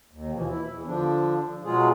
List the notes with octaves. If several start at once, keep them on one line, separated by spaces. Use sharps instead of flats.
D#2
B2 E3 F3
E4
E2
D3 F3 D4
B2 F#3 G#3 F4 G#4